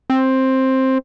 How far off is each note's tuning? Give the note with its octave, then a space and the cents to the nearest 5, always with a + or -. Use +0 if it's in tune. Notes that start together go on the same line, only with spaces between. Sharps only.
C4 +10